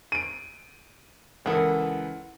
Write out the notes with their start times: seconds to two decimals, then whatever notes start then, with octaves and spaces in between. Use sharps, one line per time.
0.12 D7 D#7
1.46 C#2 E3 A4 A#4 F#5 D#6